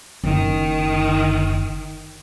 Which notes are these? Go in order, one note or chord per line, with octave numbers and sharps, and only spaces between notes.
F#1 D#3